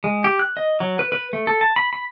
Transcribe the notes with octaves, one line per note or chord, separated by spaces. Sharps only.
G#3
G4
F#6
D#5
F#3
B4
B4
A3
A4
A5
B5
B5